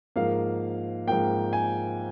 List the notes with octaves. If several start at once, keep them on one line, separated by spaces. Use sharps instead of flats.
G#2 F3 A#3 F5
G#2 F3 A#3 G5
G#5